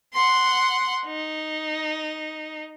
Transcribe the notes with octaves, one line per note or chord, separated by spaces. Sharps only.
F#5 C6
D#4